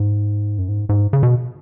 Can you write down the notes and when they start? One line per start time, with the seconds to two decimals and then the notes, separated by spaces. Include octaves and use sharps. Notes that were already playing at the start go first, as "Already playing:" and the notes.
Already playing: G#2
0.58 F#2
0.68 G#2
0.89 G#2
1.13 C#3
1.23 B2